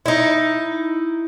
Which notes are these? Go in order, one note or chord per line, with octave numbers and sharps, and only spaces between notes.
D#4 E4